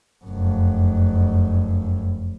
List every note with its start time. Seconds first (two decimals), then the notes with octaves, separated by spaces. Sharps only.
0.25 F1 F#2